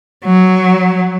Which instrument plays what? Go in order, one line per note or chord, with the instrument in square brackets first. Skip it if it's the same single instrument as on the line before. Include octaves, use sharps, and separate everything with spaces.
[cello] F#3